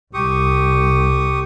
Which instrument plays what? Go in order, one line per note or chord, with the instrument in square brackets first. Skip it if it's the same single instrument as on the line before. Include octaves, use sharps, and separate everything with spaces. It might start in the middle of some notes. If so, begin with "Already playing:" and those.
[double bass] C2 [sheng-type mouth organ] G4 C#6 D#6